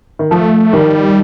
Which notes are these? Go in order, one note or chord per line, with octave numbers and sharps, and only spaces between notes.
D#3
F3 A3
D#3 G3